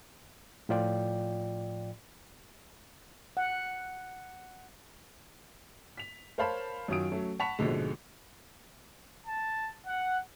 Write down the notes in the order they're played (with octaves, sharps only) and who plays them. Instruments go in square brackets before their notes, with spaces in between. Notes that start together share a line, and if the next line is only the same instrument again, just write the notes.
[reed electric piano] A2 F3 F4 D5 G5
[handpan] F#5
[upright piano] B6 F7
A#4 C5 C#5 F5 A5 B5
F#2 D#3 F#3 F4 D#6 D7
F#3 A3 C#4
F#5 A5 B5 C#6 B6 F7
A#1 G#2 B2 D3 G#3
[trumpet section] A5
F#5